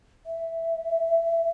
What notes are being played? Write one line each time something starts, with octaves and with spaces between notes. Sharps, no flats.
E5